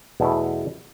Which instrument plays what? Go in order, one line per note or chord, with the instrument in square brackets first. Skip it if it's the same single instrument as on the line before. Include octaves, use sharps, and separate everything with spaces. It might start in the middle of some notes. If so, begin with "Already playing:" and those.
[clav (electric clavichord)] E2 B2 A3 E4